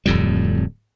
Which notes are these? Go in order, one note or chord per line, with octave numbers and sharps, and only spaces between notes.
D1 F2 A2 G3